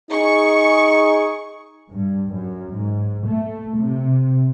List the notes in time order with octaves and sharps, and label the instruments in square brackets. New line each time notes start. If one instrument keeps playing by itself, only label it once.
[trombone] D#4 [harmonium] G#4 [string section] C#6
[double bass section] G2
F#2
G#2
A3
C3